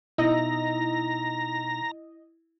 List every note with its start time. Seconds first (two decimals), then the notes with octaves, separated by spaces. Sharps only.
0.18 B2 D#4 E4 D#5 A#5